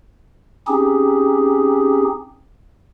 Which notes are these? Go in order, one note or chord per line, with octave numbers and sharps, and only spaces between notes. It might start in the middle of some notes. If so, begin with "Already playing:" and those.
C4 C#4 D#4 G4 G#4